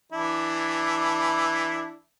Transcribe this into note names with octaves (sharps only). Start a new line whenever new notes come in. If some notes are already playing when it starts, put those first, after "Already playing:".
E3 D4 E4